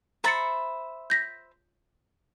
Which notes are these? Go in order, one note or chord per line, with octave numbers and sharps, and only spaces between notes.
C5 E5 A#5 B5 A6 C#7
G6 A#6 B6